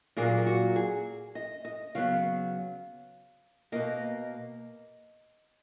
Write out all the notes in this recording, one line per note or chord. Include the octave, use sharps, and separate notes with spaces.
A#2 F#3 A#3 G#4
F#4
G#4
D#5
D#5
C#3 F#3 B3 F5
B2 A#3 D#5